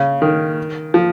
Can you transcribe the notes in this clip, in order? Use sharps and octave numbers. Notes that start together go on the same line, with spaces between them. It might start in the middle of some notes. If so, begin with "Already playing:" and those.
Already playing: C#3
D#3
F3